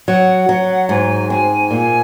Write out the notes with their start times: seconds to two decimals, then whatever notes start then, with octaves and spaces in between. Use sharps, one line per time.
0.08 F#3 F#5
0.49 F#3
0.89 G#2 G#5
1.30 C4 G#5
1.71 A#2